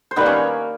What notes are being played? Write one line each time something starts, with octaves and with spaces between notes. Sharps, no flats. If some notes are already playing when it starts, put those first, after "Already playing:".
C5
D#3 G3 A#3 B3 B4
C#4 C#5